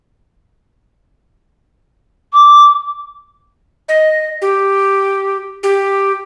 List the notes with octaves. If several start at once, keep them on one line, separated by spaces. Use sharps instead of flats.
D6
D#5
G4
G4